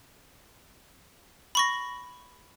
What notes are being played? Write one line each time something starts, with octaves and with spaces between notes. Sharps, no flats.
B5 C#6 A#6